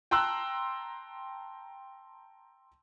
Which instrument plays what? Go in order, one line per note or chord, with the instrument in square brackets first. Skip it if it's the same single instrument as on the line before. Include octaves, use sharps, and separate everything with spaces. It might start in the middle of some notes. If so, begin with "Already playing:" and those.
[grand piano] G5 A5 A#5 C6 E6 F#6